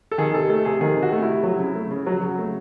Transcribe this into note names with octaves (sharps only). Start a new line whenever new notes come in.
A4
D#3 G#4
C3 A4
A3 A4
C3 G#4
D#3 G#4
C3
F#4
A3
E4
C3
F#3
C#3
A3
C#3
F#3 F#4
C#3
A3